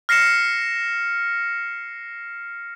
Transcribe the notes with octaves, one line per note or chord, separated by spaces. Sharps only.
F6 A#6 C7 C#7 E7